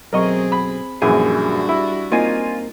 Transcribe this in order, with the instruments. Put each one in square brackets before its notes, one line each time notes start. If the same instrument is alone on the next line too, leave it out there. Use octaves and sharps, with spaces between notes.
[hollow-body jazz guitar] B1 F#2 [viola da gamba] C4 G#4 [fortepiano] A#4 D#5 C#6
[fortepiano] B5
[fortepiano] A#1 F#2 E3 [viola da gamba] G3 D4 F#4 [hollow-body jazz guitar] G#4
[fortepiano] E4
[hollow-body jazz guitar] A#3 C4 D#4 [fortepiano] F4 G#5